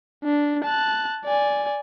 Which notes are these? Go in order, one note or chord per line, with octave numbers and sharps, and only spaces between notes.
D4
A5 F#6
D5 G#5